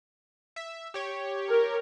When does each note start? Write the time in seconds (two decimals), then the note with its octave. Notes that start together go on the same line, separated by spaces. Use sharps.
0.56 E5
0.94 G4 C#5
1.48 A#4